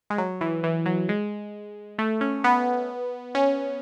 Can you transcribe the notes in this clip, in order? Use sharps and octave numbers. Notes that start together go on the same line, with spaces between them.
G#3
F#3
E3
E3
F#3
G#3
A3
C#4
B3
C#4